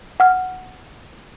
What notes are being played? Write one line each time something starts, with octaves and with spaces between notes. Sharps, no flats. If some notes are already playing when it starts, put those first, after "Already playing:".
F#5 F6